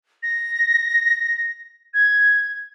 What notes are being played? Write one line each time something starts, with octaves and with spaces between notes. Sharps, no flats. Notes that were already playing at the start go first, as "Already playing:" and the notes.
A#6
G#6